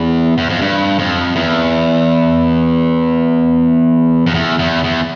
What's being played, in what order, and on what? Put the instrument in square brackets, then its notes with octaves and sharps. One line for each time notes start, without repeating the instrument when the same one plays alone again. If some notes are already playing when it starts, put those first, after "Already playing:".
Already playing: [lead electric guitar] E2
E2
F2
G2
F2
E2
F2
E2
E2
E2